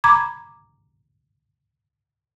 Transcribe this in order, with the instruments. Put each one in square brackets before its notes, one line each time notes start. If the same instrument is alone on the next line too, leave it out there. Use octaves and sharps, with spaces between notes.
[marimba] A#5 B5 D6 G#6